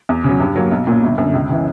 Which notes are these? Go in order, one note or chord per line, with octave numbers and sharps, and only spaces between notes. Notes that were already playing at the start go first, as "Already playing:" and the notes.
E2
C#3 F#3
G2
F#3 A#3
B1
A#2 A#3 C#4
G1
F#2 D3
C#2
C#3 E3